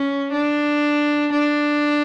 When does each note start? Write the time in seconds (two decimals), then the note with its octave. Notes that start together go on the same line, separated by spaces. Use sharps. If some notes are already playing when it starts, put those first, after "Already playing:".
Already playing: C#4
0.32 D4
1.32 D4